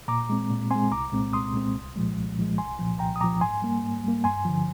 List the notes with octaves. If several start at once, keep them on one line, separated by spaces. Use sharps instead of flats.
A#2 A#5 D6
G#3 C4
A#2
G#3 C4 G#5 C6
C2 A#5 D6
A#2 G#3 C4
C2 C6 D#6
A#2 G#3 C4
C2
A#2 F3 G#3
C2
A#2 F3 G#3
C2 G#5 C6
A#2 F3
C2 G5 A#5
D#6
A#2 F3 A#5 D6
G#2 G#5 C6
G3 A#3
G#2
G3 A#3
G2 G#5 C6
D3 F3